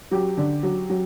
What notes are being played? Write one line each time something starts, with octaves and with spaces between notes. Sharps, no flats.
F#3 G4
D3
F#3
F#3